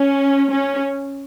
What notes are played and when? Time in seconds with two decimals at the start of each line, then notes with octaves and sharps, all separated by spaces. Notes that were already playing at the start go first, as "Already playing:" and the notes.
Already playing: C#4
0.52 C#4